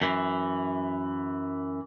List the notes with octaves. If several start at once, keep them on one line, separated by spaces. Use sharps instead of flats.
F#2 E3